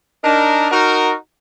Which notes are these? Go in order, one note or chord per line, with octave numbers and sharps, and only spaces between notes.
D4 D#4 A#4
D#4 F#4 A#4